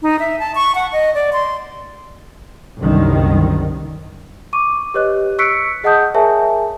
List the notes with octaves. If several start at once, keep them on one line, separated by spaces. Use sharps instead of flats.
D#4
E5
A5
C#6
F#5
D#5
D5
C6
F#1 C2 F#2 D3 D#3
C#6 D6 D#7
G4 B4 C#5 D#5 F#6
C#6 E6 F#6 B6 C#7 D7
G#4 D#5 F#5 A5 D#6 G6
G#4 A#4 C#5 E5 G#5 A5